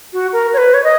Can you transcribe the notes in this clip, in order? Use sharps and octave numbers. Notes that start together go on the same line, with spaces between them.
F#4
A#4
C#5
B4
C#5
D#5